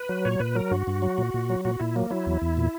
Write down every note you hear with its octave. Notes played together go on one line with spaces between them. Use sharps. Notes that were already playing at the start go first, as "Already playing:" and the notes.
Already playing: B4
F#3
A#2 C#5
A#2 B4
F#3 A#4
G2 F#4
G2
F#3
A#2
A#2
F#3
A#2 F#4
A#2 E4
F#3 A#3
F#3 E4
E2
E2
A#2